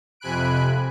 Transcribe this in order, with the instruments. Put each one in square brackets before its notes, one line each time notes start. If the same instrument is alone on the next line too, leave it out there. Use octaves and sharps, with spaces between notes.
[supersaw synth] F2 C3 G#5 B5 F#6 D7